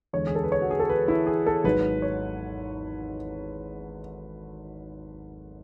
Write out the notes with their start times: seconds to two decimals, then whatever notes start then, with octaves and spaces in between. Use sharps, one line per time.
0.13 E2 D3 G#3 C#5
0.27 G#4
0.35 A4
0.43 B4
0.52 C#5
0.62 F#4
0.71 G#4
0.79 A4
0.89 B4
1.08 E4
1.26 G#4
1.46 A4
1.64 G#1 G#2 F#3 B4
2.02 C#5